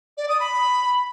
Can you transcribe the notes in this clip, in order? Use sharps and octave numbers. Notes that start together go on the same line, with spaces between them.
D5
D#6
B5